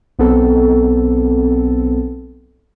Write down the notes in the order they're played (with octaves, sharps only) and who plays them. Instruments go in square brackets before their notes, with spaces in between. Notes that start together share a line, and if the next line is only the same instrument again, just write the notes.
[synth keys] B1 B3 C4 A4